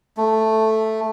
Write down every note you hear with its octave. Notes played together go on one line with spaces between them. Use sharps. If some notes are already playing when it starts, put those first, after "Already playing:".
A3